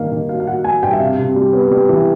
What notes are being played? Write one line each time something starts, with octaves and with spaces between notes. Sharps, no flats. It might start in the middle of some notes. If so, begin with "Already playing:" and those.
Already playing: G2 D#3 A#3 F5
D#3
F#3 F5
F5
F#3 F#5
F#3 G#5
G2 G5
E5
C3 F5
C3
G3
B3
G3
E3